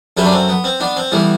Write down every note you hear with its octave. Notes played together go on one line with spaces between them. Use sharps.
F#2 F#3 A3 G4 B4
D4
C4
B3
C4
B3 D4
C4
A2 E3 G3 B3